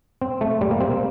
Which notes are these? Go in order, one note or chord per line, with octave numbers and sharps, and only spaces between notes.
C4
A3
G3
A#3
C4
A#3